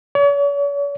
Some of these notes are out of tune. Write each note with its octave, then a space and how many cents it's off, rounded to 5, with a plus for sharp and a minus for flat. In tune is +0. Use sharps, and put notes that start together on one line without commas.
C#5 +45